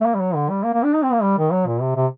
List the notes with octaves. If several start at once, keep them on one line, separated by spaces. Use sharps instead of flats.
A3
A#3
G3
F#3
D3
G3
A#3
A#3
D4
D#4
C4
A#3
G3
D#3
F#3
A#2
C3
C3